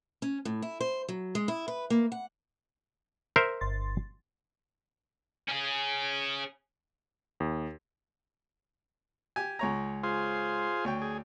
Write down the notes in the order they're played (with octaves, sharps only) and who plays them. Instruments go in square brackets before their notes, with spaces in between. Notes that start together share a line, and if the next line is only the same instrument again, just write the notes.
[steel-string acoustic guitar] C#4
A2
E4
C5
F#3
G#3
E4
B4
A#3
F#5
[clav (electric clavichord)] A#4 C5 E5
[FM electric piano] G1 C6 A6
[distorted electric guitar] C#4 G#4
[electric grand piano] D#2
[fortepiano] G4 G#5
C#2 C#5 A#5
[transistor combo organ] F4 G#4 C5
[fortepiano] D2 C#5 G5
[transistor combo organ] G#4